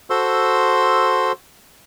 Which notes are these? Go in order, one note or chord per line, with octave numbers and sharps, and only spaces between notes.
F#4 A4 C5 C6 E6